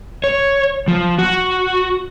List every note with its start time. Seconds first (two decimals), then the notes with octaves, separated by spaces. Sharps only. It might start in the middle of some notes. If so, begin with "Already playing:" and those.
0.24 C#5
0.88 F3
1.19 F#4